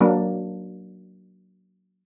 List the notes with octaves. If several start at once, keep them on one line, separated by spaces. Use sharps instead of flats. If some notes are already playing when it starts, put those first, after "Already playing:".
F#3 A#3 D4